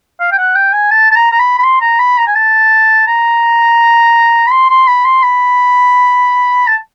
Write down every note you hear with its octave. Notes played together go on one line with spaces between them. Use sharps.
F5
G5
F#5
G5
G#5
A5
A5
A#5
A#5
B5
B5
C6
A#5
B5
A#5
G#5
A5
A#5
B5
C6
C6
B5
C6
B5
A5